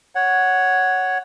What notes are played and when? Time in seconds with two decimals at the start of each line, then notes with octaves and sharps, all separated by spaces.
0.15 C#5 F#5